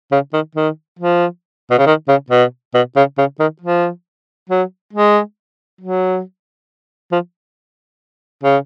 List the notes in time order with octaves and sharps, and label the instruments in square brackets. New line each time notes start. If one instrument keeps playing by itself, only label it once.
[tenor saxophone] C#3
D#3
D#3
F3
B2
C#3
D#3
C#3
B2
B2
C#3
C#3
D#3
F3
F#3
G#3
F#3
F3
C#3